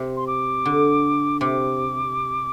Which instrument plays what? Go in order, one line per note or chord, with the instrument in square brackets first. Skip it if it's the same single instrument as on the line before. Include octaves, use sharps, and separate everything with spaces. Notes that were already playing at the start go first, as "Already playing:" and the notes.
Already playing: [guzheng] C3
[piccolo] C6
D6
[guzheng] D3
[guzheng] C3 [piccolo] D6